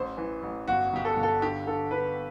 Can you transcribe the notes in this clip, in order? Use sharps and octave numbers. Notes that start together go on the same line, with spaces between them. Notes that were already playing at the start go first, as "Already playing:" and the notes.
Already playing: A1 C5
E3
A1
G1 F#4
G1 G4
A4
G1
A4
D3 G4
D3 A4
D3 B4